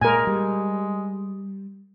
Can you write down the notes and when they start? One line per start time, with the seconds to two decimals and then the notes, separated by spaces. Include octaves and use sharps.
0.01 A#2 G#3 A#4 G#5
0.27 G3